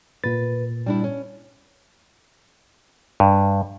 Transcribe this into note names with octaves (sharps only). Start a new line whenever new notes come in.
A#2 B4 A6
G3 D4 E4
C#4
G2